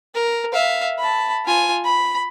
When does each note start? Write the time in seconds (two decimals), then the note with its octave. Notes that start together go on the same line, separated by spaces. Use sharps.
0.15 A#4
0.53 E5 F5
0.99 A5 B5
1.45 F4 G#5
1.85 B5